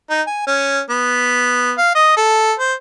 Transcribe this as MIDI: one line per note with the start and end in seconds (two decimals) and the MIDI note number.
0.10 0.22 63
0.27 0.42 80
0.47 0.82 61
0.90 1.73 59
1.78 1.94 77
1.95 2.15 75
2.17 2.53 69
2.59 2.74 72